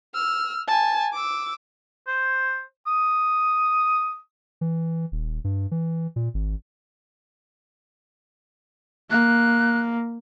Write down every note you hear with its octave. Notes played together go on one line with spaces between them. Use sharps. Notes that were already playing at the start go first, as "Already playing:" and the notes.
E6 F6
G#5 A5
D6 E6
C5
D#6
E3
D#1
G2
E3
A#2
G#1
A#3 F#6